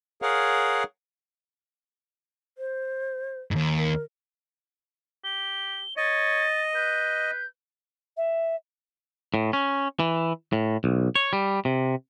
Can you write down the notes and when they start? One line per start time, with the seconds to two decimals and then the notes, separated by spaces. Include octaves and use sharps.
0.22 G#4 A#4 C#5 F5 F#5
2.58 C5
3.51 D#2 G#2
3.77 A#4
5.24 G4 G7
5.97 C#5 D#5 A6
6.75 B4 G6
8.17 E5
9.34 A2
9.53 C#4
10.00 E3
10.53 A2
10.84 B1
11.15 C#5
11.33 G3
11.65 C3